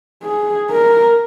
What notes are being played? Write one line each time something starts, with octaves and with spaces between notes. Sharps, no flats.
G#4
A#4